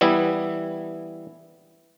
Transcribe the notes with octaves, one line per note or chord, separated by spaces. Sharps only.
E3 G3 B3 E4